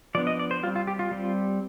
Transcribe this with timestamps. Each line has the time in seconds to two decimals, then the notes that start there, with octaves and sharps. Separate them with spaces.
0.15 F3 D5
0.17 B3 D4
0.27 D#5
0.39 D5
0.51 C5
0.63 G3 F4
0.67 C4
0.76 F4
0.87 G4
0.99 F4
1.11 G3 C4